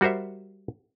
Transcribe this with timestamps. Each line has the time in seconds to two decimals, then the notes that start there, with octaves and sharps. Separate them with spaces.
0.01 G3 F#4 A#4 C5 E5